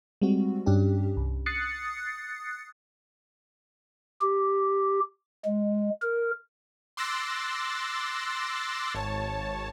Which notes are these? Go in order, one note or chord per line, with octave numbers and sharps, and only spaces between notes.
G3 G#3 C4 F#4
G2 C#4 D4 G4
C2
D#6 F#6 A6 C7 C#7
G4
G#3
A#4
C6 D6 E6 F#6 A6 A#6
G#1 C#5 A5